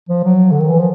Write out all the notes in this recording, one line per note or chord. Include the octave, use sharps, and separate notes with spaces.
F3
F#3
D3
D#3
E3
F3